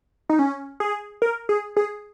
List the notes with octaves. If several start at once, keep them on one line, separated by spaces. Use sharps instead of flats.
D#4
C#4
G#4
A#4
G#4
G#4